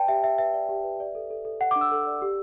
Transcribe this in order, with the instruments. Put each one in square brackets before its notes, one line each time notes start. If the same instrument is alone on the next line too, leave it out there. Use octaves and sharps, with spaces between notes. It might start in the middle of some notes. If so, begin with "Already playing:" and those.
Already playing: [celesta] B4 D5 G5 A5
G4 E5
G4 E5
B4 E5
D5
G4
B4
D5
A4
A4
A4
A4 F#5
D4 D6
E6
A4
D5
G4